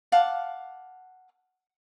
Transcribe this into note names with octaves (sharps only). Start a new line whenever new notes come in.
F5 F#5 A5 D6